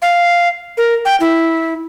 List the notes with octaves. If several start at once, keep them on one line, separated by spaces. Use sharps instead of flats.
F5
A#4
G5
E4